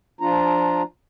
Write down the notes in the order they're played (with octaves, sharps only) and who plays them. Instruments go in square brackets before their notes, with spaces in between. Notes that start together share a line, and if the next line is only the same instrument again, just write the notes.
[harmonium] F3 D4 F4 A#5